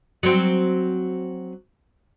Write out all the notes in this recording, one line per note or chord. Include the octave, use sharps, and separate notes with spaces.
F#3 C4